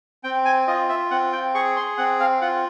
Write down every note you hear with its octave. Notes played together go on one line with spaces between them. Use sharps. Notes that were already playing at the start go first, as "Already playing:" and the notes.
C4 G5
G#5
F4 D#5
E5
C4 F#5
G5
G#4 C#6
C6
C4 F#5
F5
F4 F#5